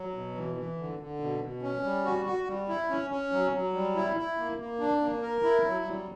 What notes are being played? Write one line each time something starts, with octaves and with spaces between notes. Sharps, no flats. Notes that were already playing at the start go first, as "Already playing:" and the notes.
Already playing: F#3
B2
E3
E3
D3
D3
B2
B2
C#4
G3
F#4
F#4
G3
E4
C#4
C#4
F#3
F#3
G3
E4
E4
A#3
A#3
D4
A#3
A#4
E4
F#3
G3